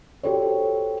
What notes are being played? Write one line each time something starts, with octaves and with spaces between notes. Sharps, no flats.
F#4 G4 A4 C5 C#5